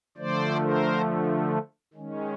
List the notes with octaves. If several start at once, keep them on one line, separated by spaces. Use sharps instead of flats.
D3 F3 A3 C5 D5
A#4 C5
D#3 G#3 C#4